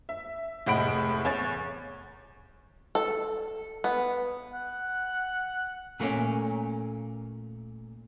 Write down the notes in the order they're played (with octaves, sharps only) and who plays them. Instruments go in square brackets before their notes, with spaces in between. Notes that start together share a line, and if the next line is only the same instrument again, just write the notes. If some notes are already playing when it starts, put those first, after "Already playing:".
[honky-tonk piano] E5
F1 A2 G#3 F#5 B5 D7
E2 C#5 A6
[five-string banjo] A4
B3
[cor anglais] F#5
[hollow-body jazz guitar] A#2 A3 A#3 C#4